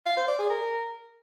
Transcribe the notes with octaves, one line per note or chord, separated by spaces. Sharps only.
F5
C5
D5
G#4
A#4